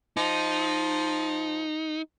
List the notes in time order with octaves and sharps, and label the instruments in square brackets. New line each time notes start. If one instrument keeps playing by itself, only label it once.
[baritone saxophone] F3 [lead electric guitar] D#4